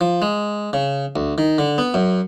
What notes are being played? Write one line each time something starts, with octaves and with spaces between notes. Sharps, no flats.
F3
G#3
C#3
D2
D#3
D3
B3
F#2